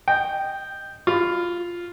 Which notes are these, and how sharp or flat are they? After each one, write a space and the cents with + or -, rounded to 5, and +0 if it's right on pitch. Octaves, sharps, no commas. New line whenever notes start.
D#5 -10 G5 +0
F4 +0 B5 +30